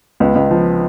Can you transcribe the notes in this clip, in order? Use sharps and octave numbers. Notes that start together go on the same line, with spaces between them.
C#2 B3
C#2
F3